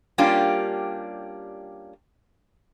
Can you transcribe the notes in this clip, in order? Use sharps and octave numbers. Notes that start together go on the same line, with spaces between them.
G3 A#3 C#4 D4 F4 G4